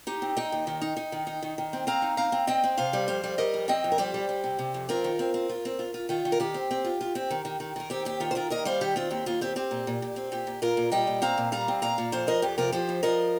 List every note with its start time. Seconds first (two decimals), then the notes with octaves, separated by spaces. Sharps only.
0.07 D#4 G4
0.22 C4
0.37 D#4 D#5 G5
0.52 D#2
0.67 D#3
0.81 D#4
0.97 D#4
1.12 D#3
1.27 D#4
1.43 D#3
1.58 D#3
1.73 C4
1.87 C4 F5 A#5
2.02 D#4
2.17 C4 F5 A#5
2.32 C4
2.47 C4 D#5 G5
2.64 C4
2.77 C3 C5 F5
2.93 G3
3.08 F2 C5 F5
3.24 G3
3.38 G3 A#4 D#5
3.54 F2
3.68 C4 D#5 G5
3.84 F2
3.92 A#4
3.98 G3 G4 C5
4.14 G3
4.29 G3
4.44 C3
4.59 C3
4.74 F2
4.89 C4 F4 A#4
5.04 D#3
5.19 C4
5.34 C4
5.49 F4
5.65 C4
5.79 F4
5.94 F4
6.09 D#3 F4
6.25 D#3
6.32 A#4
6.40 D#3 G4
6.54 C4
6.71 C4
6.85 F4
7.01 F4
7.15 C4
7.31 D#3
7.45 D#3
7.60 D#3
7.76 D#3 A#4
7.90 C4 G4
8.05 D#2 G4
8.20 D#3 F4
8.31 C5
8.35 D#3 F4 A#4
8.50 D#2 A#4 D#5
8.65 G3 C5 F5
8.81 D#3 G4
8.96 C4 F4
9.11 D#2 G4
9.26 D#2 F4
9.41 C4 G4
9.56 C4 G4
9.71 A#2
9.87 A#2
10.02 A#2
10.16 C4
10.32 A#2 G4
10.47 A#2
10.62 A#2 F4 A#4
10.77 A#2
10.92 G3 D#5 G5
11.07 A#2
11.22 C4 F5 A#5
11.38 A#2
11.52 G3 F5 A#5
11.68 C4
11.82 A#2 F5 A#5
11.98 A#2
12.12 F2 C5 F5
12.27 F3 A#4 D#5
12.42 F2 G4
12.58 C3 F4 A#4
12.72 F3 G4 C5
12.89 F2
13.03 F3 A#4 D#5